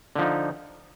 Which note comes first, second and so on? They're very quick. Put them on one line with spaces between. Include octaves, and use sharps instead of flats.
D3 F3 D#4